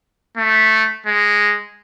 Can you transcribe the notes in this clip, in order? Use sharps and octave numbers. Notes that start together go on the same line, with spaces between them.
A3
G#3